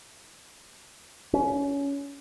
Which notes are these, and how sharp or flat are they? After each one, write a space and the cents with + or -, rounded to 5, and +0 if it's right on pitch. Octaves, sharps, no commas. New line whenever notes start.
C#4 +20